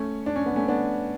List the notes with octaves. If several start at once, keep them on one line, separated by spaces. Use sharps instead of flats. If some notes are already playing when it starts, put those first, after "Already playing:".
Already playing: A3 C#4
D4
C#4
B3
A3 C#4
B3 D4